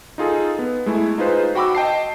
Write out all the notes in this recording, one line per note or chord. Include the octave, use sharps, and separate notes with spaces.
D#4 F4 G#4 A4
B3
G#3 A3 E4
D#4 F4 G#4 B4 C5
F#4 G5 B5 D6 E6
D#5 G5 A5 C7